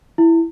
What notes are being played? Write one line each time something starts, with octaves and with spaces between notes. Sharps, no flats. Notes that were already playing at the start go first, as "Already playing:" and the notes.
E4